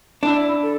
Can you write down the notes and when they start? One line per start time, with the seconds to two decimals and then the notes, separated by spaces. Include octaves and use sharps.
0.23 D4 E4
0.62 A4